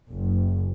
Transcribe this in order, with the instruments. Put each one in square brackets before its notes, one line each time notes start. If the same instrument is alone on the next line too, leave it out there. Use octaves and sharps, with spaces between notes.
[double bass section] F#1